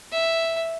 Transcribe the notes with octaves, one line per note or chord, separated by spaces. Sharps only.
E5